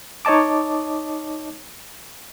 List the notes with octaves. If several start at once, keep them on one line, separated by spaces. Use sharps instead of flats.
D#4 C#5 D#5 A5 D6